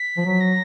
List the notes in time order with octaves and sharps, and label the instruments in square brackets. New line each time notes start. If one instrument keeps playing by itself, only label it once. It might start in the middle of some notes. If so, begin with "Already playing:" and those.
Already playing: [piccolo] B6
[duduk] F3
F#3
[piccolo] A#6